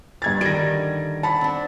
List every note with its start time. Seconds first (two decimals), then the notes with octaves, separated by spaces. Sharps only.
0.22 G2 G#6 A6
0.41 D3 D#3 G3 A#6 D7
1.23 F#5 A5 B5
1.41 C4 D4